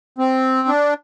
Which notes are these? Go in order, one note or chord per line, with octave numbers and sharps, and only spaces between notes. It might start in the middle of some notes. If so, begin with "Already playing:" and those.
C4
D4